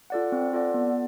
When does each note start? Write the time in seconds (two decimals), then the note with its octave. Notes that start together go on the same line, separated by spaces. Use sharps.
0.10 F4 A4 D5 F#5
0.32 C4
0.53 F4 A4 D5 F#5
0.74 B3